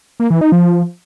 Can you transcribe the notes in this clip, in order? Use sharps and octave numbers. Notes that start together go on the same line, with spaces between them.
A#3
E3
D#4
F3